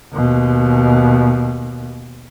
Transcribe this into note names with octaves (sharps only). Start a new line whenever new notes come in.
D#2 B2